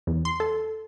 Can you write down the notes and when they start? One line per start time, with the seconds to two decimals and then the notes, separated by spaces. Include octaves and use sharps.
0.07 E2
0.25 C6
0.40 A4